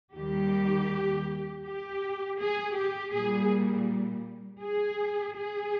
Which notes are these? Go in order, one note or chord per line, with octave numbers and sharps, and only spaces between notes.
D#2 D#3 G3 G4
G4
G#4
G4
A#2 G3 G#4
G#4
G#4